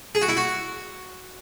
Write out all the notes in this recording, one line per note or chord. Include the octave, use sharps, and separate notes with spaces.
G#4
F#4
E4
F#4